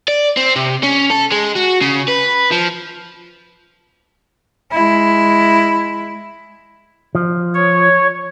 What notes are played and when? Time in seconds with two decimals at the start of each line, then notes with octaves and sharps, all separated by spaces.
0.08 D5
0.37 C4
0.56 C3
0.83 C#4
1.10 A4
1.32 G#3
1.55 F#4
1.81 C#3
2.08 B4
2.51 F3
4.72 G#3 E4
7.15 F3
7.54 C#5